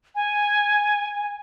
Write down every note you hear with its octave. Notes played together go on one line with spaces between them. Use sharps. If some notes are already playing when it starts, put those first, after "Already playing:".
G#5